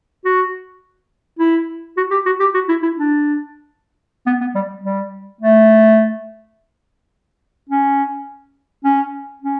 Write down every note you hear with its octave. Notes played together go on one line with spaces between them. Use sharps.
F#4
E4
F#4
G4
F#4
G4
F#4
E4
E4
D4
B3
B3
G3
G3
A3
C#4
C#4
C#4